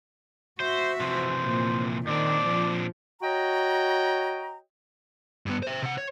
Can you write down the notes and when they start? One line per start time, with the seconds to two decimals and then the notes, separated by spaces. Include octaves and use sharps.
0.60 F#4 C5 E5
1.00 C3 E3 F3 C5
1.45 A#2
2.07 A#2 D#3 C4 D4 D5
2.46 F3
3.22 F#4 C#5 D#5 G5 A#5
5.46 G2 B3
5.63 C5 E5
5.82 C3 F#5
5.98 C#5